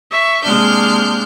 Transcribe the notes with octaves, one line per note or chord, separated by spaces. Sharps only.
E5 C#6
C3 G#3 A#3 D4 F6 G6